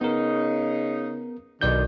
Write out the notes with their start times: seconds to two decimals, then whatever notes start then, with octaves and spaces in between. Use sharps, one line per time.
0.01 C#3 B3 D#4 A#4
1.61 B1 B2 D3 D#3 D5 G6